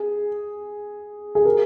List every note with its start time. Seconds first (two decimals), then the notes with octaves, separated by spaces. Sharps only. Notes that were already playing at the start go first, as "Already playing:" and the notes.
Already playing: G#4
1.35 G#4
1.45 A#4